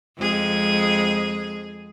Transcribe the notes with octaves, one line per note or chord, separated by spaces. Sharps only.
F2 G#3 G#4